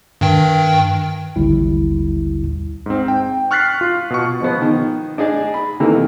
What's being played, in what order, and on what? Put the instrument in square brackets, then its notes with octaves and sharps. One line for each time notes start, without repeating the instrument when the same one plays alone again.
[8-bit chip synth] G2 D#3 G5
[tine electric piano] A1 D#2 D3 G3 E4
[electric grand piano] G#2 C4
G5
C#6 F6 F#6 A6 B6 C7
F4
B2 C#6
[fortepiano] B2 F3 B3
D#3
D4 D#4 G#4 D5
B5
C3 D#3 E3 A3 A#3